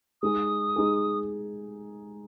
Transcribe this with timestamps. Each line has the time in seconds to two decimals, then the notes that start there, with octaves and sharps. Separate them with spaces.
0.22 G#3 D#4 G#4 D#6
0.76 G#3 D#4 G#4